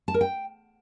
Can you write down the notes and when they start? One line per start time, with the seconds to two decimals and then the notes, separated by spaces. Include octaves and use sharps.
0.08 A5
0.14 A#4
0.21 G5